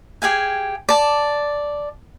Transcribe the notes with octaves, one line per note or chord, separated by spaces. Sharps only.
G4 G#4 F5 G#5
D5 A5